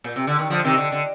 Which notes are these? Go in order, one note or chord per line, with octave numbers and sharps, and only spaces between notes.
A#2
C3
D3
D#3
D3 F3
C3 D#3
D3
D3